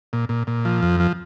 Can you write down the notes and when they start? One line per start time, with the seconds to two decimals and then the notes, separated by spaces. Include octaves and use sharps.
0.13 A#2
0.29 A#2
0.47 A#2
0.65 F3
0.83 F2
1.00 F3